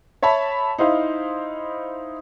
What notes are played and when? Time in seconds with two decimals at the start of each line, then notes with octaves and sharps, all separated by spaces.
0.22 C#5 E5 A5 B5
0.78 D#4 E4 C5 F5